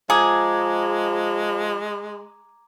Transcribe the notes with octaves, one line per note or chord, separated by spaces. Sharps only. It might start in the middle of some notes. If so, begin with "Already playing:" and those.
F3 G#3 G#4 A#5 D6 G#6